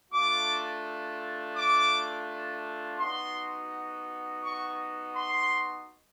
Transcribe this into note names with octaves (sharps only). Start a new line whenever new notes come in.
A3 D4 F4 D6
D6
B3 D#4 F#4 C6
C#6
C6